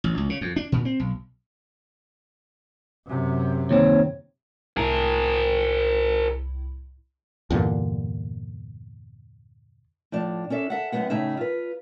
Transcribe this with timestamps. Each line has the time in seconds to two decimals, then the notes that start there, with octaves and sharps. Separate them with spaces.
0.04 A1
0.18 C#2
0.30 C#3
0.41 F2
0.56 D4
0.72 A#2
0.85 C4
1.00 B1
3.07 F#2 C3
3.71 D#2 C4 C#5
4.77 C2 A2 E4 G#4 A#4
7.50 E2 G2 A#2 D3
10.12 A2 F3 D4
10.50 C#4 D4 A4 E5
10.70 A4 E5 F#5
10.92 F#2 A2 C#3 G#3 B3 F#5
11.10 A2 C#3 D#4 G#4 E5
11.37 F4 B4